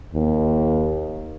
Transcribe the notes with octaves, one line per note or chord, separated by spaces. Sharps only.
D#2